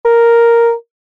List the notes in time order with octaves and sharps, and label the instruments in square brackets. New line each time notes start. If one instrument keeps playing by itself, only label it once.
[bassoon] A#4